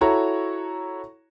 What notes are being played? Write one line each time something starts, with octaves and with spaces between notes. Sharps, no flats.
E4 F#4 A4 C#5 A#5 C#6